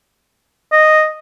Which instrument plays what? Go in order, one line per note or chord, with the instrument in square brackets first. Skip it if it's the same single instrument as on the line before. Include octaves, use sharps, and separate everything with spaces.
[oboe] D#5